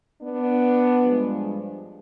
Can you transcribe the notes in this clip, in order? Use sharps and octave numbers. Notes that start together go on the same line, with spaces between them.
B3 D4
G2 F3 G#3